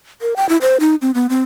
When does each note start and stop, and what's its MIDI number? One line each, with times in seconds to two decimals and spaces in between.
0.22 0.34 70
0.36 0.48 79
0.49 0.57 64
0.62 0.77 72
0.80 0.95 63
1.02 1.11 60
1.15 1.27 59
1.30 1.43 60